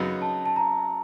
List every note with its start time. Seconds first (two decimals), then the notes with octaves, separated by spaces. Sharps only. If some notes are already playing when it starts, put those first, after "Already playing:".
Already playing: F#2 C#3 F#3 B3 D#4
0.22 A5
0.46 A5
0.56 A#5